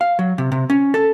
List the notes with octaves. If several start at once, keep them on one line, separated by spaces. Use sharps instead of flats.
F5
F#3
C3
C3
C#4
A4